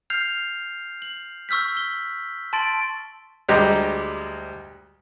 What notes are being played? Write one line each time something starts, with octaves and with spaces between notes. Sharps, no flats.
F6 G6 C7 F7
F#7
C#6 E6 F6 G6 B6
G7
A5 C6 A6 D7 F#7
D2 G3 G#3 G4 D#5 A#5